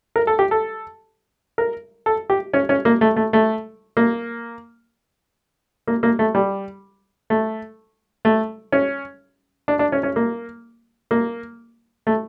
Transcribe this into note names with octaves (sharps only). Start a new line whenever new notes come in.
A#4
A4
G4
A4
A#4
A4
G4
C#4
C#4
A#3
A3
A3
A3
A#3
A#3
A#3
A3
G3
A3
A3
C#4
D4
D4
C#4
C#4
A#3
A#3
A3